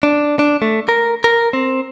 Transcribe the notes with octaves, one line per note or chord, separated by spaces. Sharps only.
D4
D4
A3
A#4
A#4
C4